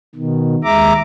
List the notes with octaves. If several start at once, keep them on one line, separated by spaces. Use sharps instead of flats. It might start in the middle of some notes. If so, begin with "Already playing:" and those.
B2 D#3
D#2 G#3 E5 A#5 D6